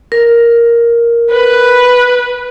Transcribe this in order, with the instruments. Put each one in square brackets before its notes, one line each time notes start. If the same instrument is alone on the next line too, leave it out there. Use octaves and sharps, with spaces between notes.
[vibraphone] A#4
[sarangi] B4